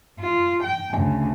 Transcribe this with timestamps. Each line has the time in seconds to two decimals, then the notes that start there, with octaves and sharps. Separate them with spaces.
0.20 F4
0.63 G5
0.95 D2 C#3